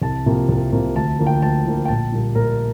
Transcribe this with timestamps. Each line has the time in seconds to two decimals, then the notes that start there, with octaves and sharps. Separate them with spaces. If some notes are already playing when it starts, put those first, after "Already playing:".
0.02 C2 A5
0.26 C3 F3 A#3
0.49 C2
0.72 C3 F3 A#3
0.95 D2 A5
1.19 D3 F3 A#3
1.27 G5
1.42 D2 A5
1.65 D3 F3 A#3
1.85 G5
1.88 A#1 A5
2.12 A#2 G3 A#3
2.35 A#1 A#4